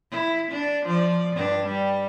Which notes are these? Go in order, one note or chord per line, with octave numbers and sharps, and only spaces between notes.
E4
D4
F3 D5
G2 D4
G3